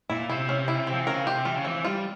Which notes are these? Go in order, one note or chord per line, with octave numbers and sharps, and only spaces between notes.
A#2 E4
C3 E4
C#4
E4
C4
F3
E3
C#3 A#4
C3 G4
E3 F4
C#3
E3 C4
G3 F4